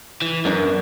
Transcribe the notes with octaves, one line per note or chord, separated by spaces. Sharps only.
E3
F#2 B3 D4 A#4